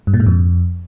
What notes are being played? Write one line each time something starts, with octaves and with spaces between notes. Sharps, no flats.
G2
A#2
G#2
F2